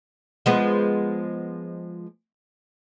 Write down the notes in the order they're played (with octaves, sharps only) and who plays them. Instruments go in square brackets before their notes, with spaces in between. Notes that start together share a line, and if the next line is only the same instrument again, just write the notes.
[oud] F3 G#3 B3